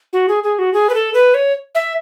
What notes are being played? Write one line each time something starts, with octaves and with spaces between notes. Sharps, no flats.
F#4
G#4
G#4
F#4
G#4
B4
A4
B4
C#5
E5